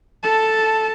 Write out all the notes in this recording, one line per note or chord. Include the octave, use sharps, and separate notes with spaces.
A4 A5